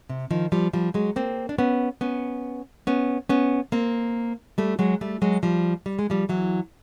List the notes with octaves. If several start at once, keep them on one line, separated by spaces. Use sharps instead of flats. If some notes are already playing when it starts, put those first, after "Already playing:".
C3
D#3 F3
F3 G3
F3 G3
F#3 G#3
A#3 C4
D4
B3 C#4
B3 C#4
B3 C#4
B3 C#4
A#3 C4
G3 A3
F#3 G#3
G3 A3
F#3 G#3
F3 G3
G3
G#3
F3 G3
E3 F#3